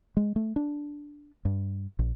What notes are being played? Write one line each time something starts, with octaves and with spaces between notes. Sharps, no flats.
G#3
A3
D4
G2
A#1